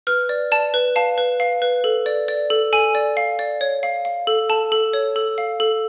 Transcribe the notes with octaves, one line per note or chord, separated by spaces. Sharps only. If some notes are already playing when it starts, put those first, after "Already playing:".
B4 F6
D5
D5 A5
B4
F5 A5
B4
F5
B4
A4
D5
D5
A4
A4 G#5
D5
F5
D5
C#5
F5
F5
A4
A4 A5
A4
C#5
A4
F5
A4